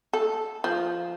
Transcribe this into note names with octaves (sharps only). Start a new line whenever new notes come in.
A4
F3